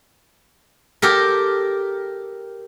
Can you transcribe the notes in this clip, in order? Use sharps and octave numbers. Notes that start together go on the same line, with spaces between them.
G4 A4 A#4